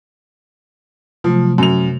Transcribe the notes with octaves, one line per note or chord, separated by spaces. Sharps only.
C3 F3 F#3 A3
F#2 F7